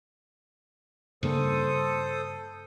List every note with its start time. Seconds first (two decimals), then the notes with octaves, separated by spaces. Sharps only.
1.23 G2 C#3 A#3 A4 C5 D#6